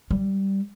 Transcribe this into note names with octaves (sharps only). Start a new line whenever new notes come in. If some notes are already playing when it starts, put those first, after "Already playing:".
G3